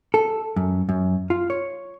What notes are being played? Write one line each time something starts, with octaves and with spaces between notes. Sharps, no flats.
A4
F#2
F#2
F4
C#5